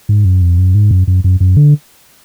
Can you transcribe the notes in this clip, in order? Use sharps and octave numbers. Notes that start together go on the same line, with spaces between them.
G#2
F#2
F2
F#2
G#2
F#2
F#2
F#2
F#2
D3